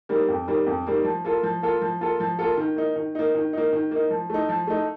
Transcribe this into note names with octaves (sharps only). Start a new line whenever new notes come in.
D#3 G3 A#3
F2
D#3 G3 A#3
F2
D#3 G3 A#3
F3
A#3 F4 A4
F3
A#3 F4 A4
F3
A#3 F4 A4
F3
A#3 F4 A4
D#3
A#3 D#4
D#3
A#3 D#4
D#3
A#3 D#4
D#3
A#3 D#4
F3
A3 D#4
F3
A3 D#4